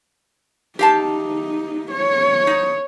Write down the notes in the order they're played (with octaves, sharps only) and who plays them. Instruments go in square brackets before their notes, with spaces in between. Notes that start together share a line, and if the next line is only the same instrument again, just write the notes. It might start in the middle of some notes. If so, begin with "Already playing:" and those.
[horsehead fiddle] D#4 [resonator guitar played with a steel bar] G4 F5 A5
[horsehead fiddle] C#5
[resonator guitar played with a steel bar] D#4